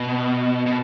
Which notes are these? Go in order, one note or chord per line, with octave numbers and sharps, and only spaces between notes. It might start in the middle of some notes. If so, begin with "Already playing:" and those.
Already playing: B2
B2